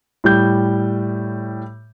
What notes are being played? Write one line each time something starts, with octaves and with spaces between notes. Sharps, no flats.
A2 G3 G6